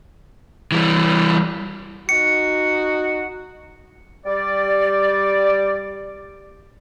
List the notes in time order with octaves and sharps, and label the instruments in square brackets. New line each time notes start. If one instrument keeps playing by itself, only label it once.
[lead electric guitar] E3 G3
[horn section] D#4 F#4 [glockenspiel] C#7
[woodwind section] G3 G4 D5